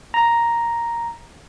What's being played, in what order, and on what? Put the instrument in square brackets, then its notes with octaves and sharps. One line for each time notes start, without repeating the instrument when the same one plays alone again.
[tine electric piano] A#5